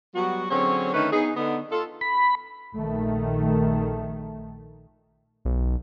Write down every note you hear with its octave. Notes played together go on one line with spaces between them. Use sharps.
F#3 G3 B3 F#4
D3 F#3 C4 C#4 G#4 C#5
D3 D#3 A3 C#4 D#4 B4
B3 D#4 G#4
D3 B3 D#4
F4 A4
B5
A#1 D#3 A3
B1